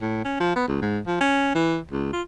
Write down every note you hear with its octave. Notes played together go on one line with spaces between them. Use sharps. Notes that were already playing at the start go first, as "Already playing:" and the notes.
A2
C#4
F3
B3
C#2
G#2
F3
C#4
E3
C#2
F4